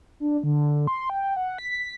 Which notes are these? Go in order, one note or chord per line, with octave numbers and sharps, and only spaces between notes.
D4
D3
C6
G5
F#5
B6